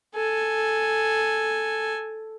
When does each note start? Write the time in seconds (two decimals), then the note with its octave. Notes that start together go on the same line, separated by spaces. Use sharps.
0.15 A4 G#5